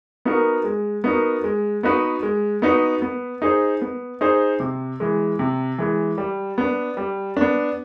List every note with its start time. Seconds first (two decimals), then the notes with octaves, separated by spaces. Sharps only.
0.25 B3 D#4 F#4 A#4
0.64 G#3
1.04 B3 D#4 F#4 A#4
1.44 G#3
1.83 B3 D#4 F#4 B4
2.23 G#3
2.62 B3 D#4 F#4 B4
3.02 B3
3.42 D#4 G#4 C5
3.81 B3
4.21 D#4 G#4 C5
4.60 C3
5.00 E3 G#3
5.39 C3
5.78 E3 G#3
6.18 G3
6.58 B3 D4
6.97 G3
7.37 B3 D4